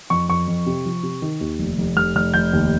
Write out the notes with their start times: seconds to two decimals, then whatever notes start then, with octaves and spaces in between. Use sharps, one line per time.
0.10 F2 C#6
0.29 F2 C#6
0.48 F2
0.66 C3
0.85 F3
1.03 C3
1.22 D#3
1.41 D#2
1.59 F1
1.78 F1
1.96 F1 F6
2.15 F1 F6
2.34 F1 G6
2.53 D#2